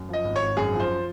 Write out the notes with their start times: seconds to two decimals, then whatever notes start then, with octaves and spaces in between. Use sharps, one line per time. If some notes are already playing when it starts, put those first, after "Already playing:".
Already playing: F#2
0.09 F3 D#5
0.24 G#1
0.36 C#5
0.42 G#1
0.57 F#2 G#4
0.73 F3
0.80 C5